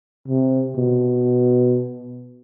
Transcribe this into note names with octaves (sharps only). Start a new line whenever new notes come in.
C3
B2